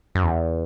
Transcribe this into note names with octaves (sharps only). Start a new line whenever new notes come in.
F#2
E2